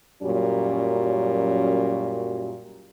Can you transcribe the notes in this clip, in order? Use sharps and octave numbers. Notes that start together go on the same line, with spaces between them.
F#2 A#2 F#3 G3 C#4